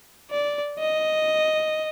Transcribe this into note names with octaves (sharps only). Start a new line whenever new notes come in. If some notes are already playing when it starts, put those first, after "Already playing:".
D5
D#5